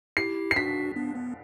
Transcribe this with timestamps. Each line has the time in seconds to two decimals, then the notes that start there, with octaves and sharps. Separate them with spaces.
0.17 E4 G4 C7
0.51 C7
0.56 D4 F#4 B6
0.96 B3 D4
1.16 B3